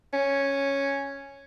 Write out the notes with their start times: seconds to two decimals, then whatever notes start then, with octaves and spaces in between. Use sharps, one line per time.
0.13 C#4